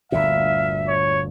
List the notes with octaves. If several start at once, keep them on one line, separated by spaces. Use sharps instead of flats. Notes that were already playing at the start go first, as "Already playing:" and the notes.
G1 D2 A#2 E5 F5
C#5